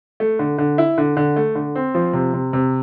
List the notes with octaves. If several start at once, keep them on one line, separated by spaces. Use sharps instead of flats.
A3
D3
D3
E4
D3
D3
A3
D3
C4
F3
C3
C3
C3